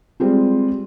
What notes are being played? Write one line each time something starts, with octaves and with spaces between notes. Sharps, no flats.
G3 G#3 C4 F4